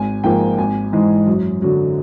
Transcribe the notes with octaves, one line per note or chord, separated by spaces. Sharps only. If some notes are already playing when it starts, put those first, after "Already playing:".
Already playing: G#1 G#5
G#2 F3 A#3 G5
G#1 G#5
G#2 E3 G#3
F#2
D3 F#3